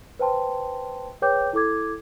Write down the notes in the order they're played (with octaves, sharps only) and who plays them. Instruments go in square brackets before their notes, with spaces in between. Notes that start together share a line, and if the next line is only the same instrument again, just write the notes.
[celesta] B4 C5 G5 A5 C6
G#4 B4 C#5 G5 D6 G6
E4 A4 D6 G#6